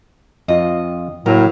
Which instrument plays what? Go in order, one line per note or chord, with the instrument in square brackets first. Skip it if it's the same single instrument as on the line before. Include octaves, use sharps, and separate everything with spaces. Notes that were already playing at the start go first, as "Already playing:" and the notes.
[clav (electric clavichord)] F2 F4 [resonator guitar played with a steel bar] D#5
[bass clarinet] A2 [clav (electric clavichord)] F#3 A#3 [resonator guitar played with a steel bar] A#4